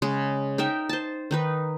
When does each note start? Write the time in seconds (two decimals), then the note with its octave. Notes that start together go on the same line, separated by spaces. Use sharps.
0.02 C#3 G#3
0.58 D#4 A#4 E5 G5
0.89 C5 A5
1.31 D#3 D#4 B4